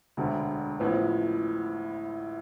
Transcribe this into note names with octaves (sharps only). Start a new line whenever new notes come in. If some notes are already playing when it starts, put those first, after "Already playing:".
E1 D2 D3
A1 A2 F3 B3